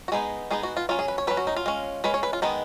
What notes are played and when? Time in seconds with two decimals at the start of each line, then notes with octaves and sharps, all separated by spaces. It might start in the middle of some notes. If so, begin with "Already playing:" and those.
0.08 F#4
0.12 G#3 B3 D#4 G#4
0.51 G#3 B3 D#4 G#4
0.63 F#4
0.77 F4
0.89 F#3 C#4 F4
0.99 G#4
1.08 B4
1.18 C#5
1.27 F#3 C#4 B4
1.37 F#4
1.47 D#4
1.56 F4
1.66 G#3 C#4
2.04 G#3 C#4 B4
2.14 C#5
2.23 B4
2.33 F4
2.42 D#3 G#3 B3 D#4